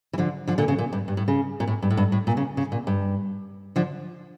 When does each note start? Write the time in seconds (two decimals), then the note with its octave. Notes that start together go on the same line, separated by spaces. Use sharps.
0.13 E3
0.18 D3 F3
0.47 D3 F3
0.58 A#2 D3
0.68 C#3
0.78 A#2
0.93 G2
1.08 G2
1.17 A2
1.28 C#3
1.60 A#2
1.67 A2
1.82 G2
1.90 A2
1.97 G2
2.12 A2
2.27 A#2
2.37 C#3
2.57 C#3
2.72 A#2
2.87 G2
3.76 D3 F3